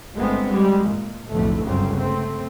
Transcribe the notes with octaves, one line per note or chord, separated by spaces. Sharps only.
G1 G#3 A3 B3 C4
G3 G#3
A#2
B1 F2 A2 D3 A3
G1 C#2 C#3 F#3 G3 C4
A3 C4